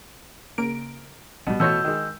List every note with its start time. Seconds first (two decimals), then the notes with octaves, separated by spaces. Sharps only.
0.58 C#3 A#3 A#4 D7
1.47 B1 B2 G3
1.60 B2 E3 A3 F4 F#4 C#5 E6 G6
1.85 D#3 G#3